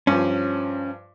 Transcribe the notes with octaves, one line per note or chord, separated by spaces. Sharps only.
G2 F3 C#4